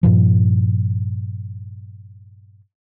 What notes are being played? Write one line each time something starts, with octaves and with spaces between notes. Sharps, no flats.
G2 A#2 F3